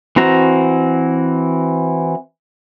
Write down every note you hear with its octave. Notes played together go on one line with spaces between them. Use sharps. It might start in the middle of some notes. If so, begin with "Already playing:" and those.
E3 C4 F#4 A#5